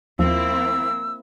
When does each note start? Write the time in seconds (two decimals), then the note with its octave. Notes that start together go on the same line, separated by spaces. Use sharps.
0.19 D#2 F3 A#3 C4 E4 E6